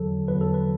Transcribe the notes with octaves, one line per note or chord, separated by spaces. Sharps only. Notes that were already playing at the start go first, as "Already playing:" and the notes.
Already playing: E2 D3 F#3 A4
E2 D3 F#3 B4
A4
B4